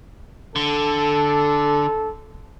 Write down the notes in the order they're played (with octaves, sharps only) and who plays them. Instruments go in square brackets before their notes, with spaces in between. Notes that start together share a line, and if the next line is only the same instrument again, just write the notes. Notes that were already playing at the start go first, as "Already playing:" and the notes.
[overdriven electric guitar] D3 [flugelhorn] A4